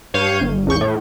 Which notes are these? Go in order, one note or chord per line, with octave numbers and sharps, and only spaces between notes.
G2 C#5 F5 G6 D#7
G1
A1 E2 C#6 G6
A2